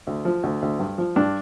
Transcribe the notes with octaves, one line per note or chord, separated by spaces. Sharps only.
D2
F3
D2
D2
G2
F3
G2 D4